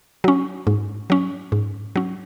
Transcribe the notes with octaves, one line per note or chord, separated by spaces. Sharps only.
F#3 C#4
G#2
F#3 C#4
G#2
F#3 C#4